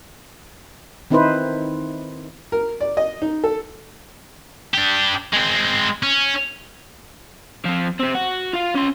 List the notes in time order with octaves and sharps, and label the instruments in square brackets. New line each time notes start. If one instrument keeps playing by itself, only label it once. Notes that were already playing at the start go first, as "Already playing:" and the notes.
[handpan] D#3 C4 D#4 E4 B4 C5
[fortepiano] A#4
D5
D#5
D#4
A4
[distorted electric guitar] D4 G4
G#3 C4
C#4
[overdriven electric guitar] F3 C4
C3 C4
F#4
F4 F5
C#4 C6